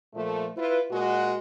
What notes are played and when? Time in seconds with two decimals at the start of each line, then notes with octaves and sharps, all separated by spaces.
0.14 A#2 F3 A3
0.57 E4 F4 B4
0.91 A#2 G#3 F#4